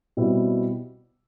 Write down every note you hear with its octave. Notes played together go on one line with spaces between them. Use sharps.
B2 G3 C4 E4